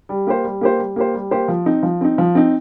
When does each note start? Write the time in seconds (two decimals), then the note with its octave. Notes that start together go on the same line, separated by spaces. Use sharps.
0.09 G3
0.27 A#3 G4 C5
0.45 G3
0.61 A#3 G4 C5
0.79 G3
0.96 A#3 G4 C5
1.14 G3
1.31 A#3 G4 C5
1.48 F3
1.66 C4 D#4
1.83 F3
2.01 C4 D#4
2.18 F3
2.35 C4 D#4